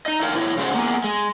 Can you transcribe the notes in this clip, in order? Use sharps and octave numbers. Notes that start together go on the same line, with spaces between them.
D#4 D#5
A#4 C#5 D#5 F5 G5 A5
E2 E4 C#5
C#3 G#3 F#4 B4 C5
A#3 B3 G#4
G#3